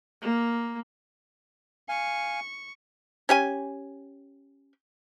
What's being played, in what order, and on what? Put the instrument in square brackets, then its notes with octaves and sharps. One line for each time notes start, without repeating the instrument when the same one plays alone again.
[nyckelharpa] A#3
[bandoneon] F5 G#5 [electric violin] C#6
[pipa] C#4 G4 G#5